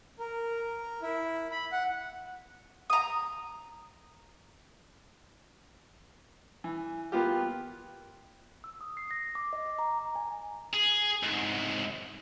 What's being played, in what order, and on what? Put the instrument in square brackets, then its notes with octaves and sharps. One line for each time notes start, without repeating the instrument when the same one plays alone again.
[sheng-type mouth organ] A#4
E4
B5
F#5
[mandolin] A#5 D#6
[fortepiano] E3
A#3 B3 F4 G4
[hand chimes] E6
D#6
C7
A#6
D6
D#5
D6
A#5
A#5
G#5
[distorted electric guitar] G#4
C2 G#2